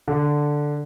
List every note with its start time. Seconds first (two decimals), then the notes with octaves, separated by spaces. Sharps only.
0.08 D3